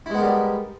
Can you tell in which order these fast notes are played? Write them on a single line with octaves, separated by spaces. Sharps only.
E4 G#3 B3 A#4 G3